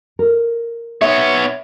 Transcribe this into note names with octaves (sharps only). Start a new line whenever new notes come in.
A#4
B3 C#5 E5